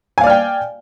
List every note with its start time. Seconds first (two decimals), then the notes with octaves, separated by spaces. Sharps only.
0.18 G#5
0.21 F5
0.24 D5
0.27 F6
0.30 G5